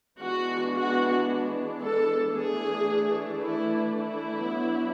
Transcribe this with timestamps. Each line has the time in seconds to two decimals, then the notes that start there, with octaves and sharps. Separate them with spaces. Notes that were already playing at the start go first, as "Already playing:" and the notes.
0.20 E3 G#3 B3 D4 F#4
0.75 F#4
1.82 A4
2.35 E3 A3 D4 G#4
3.41 E4
3.96 E4
4.49 F#3 B3 D4